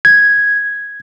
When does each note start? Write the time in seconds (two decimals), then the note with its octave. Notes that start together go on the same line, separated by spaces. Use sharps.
0.05 G#6